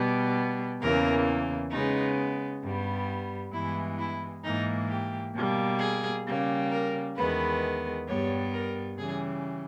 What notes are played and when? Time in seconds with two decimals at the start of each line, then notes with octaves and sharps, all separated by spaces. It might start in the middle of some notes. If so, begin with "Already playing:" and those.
Already playing: B2 G3 B3
0.80 E2 C#3 E3 A#3 A#4
1.71 C#3 G#3 B3 D#4
2.63 G2 G3 B3
3.53 G2 E3 G#3 B3 E4
3.99 E4
4.44 G#2 E3 A#3 D#4
4.89 G4
5.34 B2 G3 A#3
5.80 G#4
6.26 C#3 G3 A#3
6.71 A#4
7.16 E2 D#3 G#3 B3 B4
8.07 G2 G3 B3 C#5
8.53 A#4
8.98 C#3 E3 G3 G#4